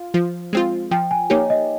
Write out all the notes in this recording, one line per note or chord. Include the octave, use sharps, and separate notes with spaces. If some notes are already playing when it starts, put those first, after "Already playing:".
Already playing: F4
F3
G#3 C4 F4
F3 G5
G#5
A#3 D#4 G4 C#5
D#5